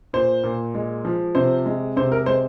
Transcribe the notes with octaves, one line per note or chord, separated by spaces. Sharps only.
A#2 C5
A#2
G#3
F3
C3 C5
G#3
C3 C5
A#4
G#3 C5